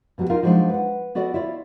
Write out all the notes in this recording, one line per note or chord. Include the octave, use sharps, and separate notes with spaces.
B2 F#3 G3 F#4
D#4 F4 A#4 D#5 F5
F3 F#3 G#3 A#3 D4 D#4
B4 F#5
B3 F#4 A4 D5 D#5
E4 F4 C#5 D5